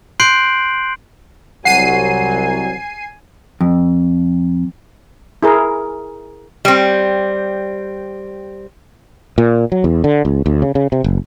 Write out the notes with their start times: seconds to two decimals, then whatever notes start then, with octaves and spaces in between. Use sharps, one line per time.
0.20 C6 F#6 G6 C7 D7 F#7
1.65 C2 F#3 F#5 G#5 C7 D#7
3.61 F2
5.43 E4 G#4 A#4
6.65 G3 C4
9.38 A#2
9.72 F#3
9.84 E2
10.04 D3
10.25 C#2
10.46 D2
10.62 C#3
10.75 C#3
10.92 C3
11.04 F#1